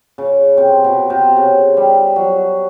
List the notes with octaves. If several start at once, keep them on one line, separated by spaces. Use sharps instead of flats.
C#3
C3
B2
C3
C#3
G3
F#3